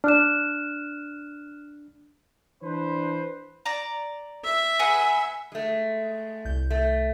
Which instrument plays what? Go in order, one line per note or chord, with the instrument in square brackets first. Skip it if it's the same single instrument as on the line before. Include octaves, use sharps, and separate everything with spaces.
[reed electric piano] D4 [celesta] F6 F#6 E7
[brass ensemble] E3 D4 B4 C5
[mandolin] D5 A#5
[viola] E5
[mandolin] G#4 B4 F#5
[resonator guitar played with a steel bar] G#3 A3
[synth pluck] C2 G6
[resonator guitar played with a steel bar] A3